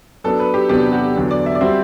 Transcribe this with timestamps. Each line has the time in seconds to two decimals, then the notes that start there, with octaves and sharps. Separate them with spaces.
0.24 F#3 B3 D4 A4
0.39 B4
0.54 G4
0.69 E2 C3 F#3 B3 D4 G4
0.92 F#4
1.15 E2 D3 F#3
1.31 D5
1.46 E5
1.55 D5
1.61 G3 C4 F#4 C5 E5